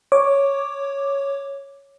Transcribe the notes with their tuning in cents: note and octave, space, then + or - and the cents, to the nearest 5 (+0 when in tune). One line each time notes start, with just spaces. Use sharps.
C#5 +0 D6 +0